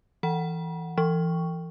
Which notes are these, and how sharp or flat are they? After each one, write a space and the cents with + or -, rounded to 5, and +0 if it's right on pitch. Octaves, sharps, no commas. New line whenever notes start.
E3 +0 F#5 +0 B5 -45
E3 +20 C#6 +0